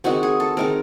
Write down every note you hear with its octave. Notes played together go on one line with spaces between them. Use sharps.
D#3 G#3 C4 F#4
G#4
A4
D#3 G#3 C4 A#4